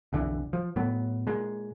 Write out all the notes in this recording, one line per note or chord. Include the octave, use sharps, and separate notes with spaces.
F1 B1 D3 E3
F3
A2 F#3 B3
A#2 G#3